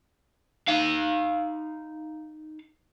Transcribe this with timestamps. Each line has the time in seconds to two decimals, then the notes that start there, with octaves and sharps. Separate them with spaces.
0.68 D#4 F5